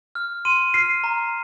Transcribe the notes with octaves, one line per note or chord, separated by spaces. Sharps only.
F6
C6 D#7
F6 C7
A#5